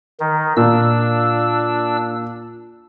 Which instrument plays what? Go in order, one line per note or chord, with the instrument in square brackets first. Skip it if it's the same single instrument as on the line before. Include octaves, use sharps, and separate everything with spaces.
[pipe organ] D#3
[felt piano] A#2 [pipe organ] D4 E6